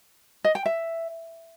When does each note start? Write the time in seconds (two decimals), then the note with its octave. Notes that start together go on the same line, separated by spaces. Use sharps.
0.44 D#5
0.55 G5
0.66 E5